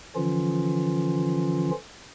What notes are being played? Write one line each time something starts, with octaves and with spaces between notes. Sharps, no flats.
D3 E3 F3 C#4 F4